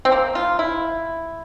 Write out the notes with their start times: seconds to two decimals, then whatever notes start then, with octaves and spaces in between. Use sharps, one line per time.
0.05 C4
0.12 A#3
0.35 F4
0.59 E4